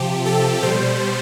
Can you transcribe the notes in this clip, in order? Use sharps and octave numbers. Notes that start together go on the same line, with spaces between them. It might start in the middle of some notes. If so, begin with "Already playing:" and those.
Already playing: C3 F3 G4
A4
B2 G3 C5